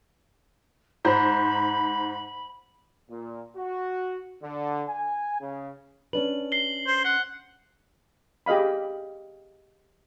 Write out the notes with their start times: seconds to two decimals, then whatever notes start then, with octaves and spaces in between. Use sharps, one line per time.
1.05 G#2 C5 A#5 B5
3.10 A#2
3.57 F#4
4.43 D3
4.89 G#5
5.41 C#3
6.13 C#4 D4 B4 F#7
6.52 C7 G7
6.87 C5
7.05 F#5 C7
8.46 G4 G#4 D#5 F5 B5